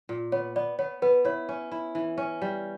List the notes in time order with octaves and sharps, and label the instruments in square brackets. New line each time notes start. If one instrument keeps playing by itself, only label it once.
[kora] A#2
[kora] B3 [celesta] C#5
[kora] B3 [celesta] D5
[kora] B3 [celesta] C#5
[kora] B3 [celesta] B4
[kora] E4 [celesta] C#5
[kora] C#4
E4
E3
C#4
G3